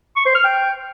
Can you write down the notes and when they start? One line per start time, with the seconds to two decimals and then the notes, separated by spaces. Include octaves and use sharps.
0.16 C#6
0.26 C5
0.35 F6
0.44 G5